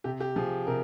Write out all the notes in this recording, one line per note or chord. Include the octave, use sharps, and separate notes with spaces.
C3 G4
G4
F3 G#4
C3 A#4